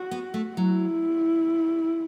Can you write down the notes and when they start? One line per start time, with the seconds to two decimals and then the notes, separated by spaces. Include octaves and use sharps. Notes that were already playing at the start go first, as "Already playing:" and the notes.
Already playing: F#4
0.11 B3
0.34 A3
0.57 F#3 E4